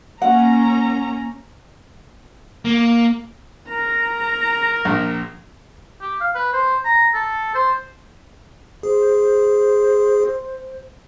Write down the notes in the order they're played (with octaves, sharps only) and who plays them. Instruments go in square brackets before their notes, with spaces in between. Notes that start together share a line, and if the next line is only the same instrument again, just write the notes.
[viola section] A#3 C#4 A#5 [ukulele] F#5
[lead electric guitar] A#3
[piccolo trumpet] A#4 [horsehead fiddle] A#5
[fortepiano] A#1
[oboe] G4
F5
B4
C5
A#5
A4
C5
[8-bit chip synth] G#4 [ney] C5